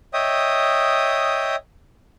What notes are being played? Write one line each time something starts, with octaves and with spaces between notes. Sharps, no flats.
C#5 D#5 E5 G5 D#6